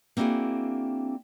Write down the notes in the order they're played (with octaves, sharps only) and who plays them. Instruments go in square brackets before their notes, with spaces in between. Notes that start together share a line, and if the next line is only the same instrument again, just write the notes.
[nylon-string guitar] A#3 C4 D4 E4 F#4 G#4